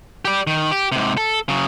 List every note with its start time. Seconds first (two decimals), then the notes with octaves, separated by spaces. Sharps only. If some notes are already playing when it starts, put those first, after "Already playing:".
0.25 G4 D5
0.47 D#3
0.71 G4
0.92 G#2 C3
1.17 A4
1.48 C#3 F#3